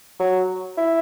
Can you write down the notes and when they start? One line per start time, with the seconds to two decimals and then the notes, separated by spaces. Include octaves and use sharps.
0.19 F#3
0.77 E4